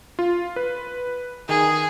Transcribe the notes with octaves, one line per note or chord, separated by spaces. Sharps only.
F4
B4
D#3 G#4